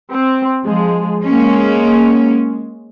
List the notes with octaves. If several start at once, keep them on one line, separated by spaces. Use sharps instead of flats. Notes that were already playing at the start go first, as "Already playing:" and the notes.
C4
F3 G#3
G#3 A#3 C#4